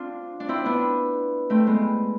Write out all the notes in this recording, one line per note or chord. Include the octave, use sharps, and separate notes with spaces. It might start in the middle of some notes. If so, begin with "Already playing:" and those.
Already playing: C4 D4 F4
D4
C4 E4
B3 D4
A3 C4
G#3 B3